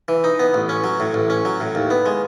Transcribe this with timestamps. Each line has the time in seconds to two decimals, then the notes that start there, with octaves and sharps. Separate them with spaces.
0.08 E3
0.24 D#4
0.39 B3
0.54 A1
0.69 C#4
0.84 F#3
1.00 A2
1.14 A1
1.30 C#4
1.45 F#3
1.60 A2
1.75 D#2
1.90 B3
2.06 G#3